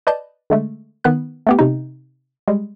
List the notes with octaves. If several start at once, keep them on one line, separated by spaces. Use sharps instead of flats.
B4 D5 D#5 A5 G6
D3 G#3 A3
D#3 B3 B4 F#6
A3 B3 G4
C3 D#4
G3 G#3